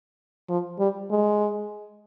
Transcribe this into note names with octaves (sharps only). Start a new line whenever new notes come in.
F3
G3
G#3